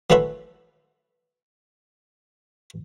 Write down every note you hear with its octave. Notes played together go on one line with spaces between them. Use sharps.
E3 F#3 A3 B4 C5 E5